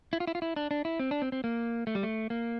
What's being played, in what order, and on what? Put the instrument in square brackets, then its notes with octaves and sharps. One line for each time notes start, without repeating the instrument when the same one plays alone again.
[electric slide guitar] E4
F4
E4
F4
E4
D4
D4
E4
C4
D4
C4
C4
A#3
A3
G3
A3
A#3